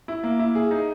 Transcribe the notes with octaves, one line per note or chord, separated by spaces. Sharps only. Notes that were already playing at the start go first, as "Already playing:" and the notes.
E4
A#3
E4
G#4
D#4